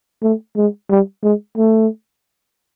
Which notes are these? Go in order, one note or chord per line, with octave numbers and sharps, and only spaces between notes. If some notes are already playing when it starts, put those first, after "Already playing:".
A3
G#3
G3
G#3
A3